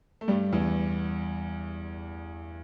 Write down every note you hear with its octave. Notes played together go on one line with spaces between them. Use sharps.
A3
G2 G3
E2 E3